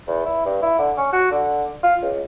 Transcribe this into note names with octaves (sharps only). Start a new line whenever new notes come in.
E2
E4
G2
E4
D3
C#4
F#4
D3
F4
C#2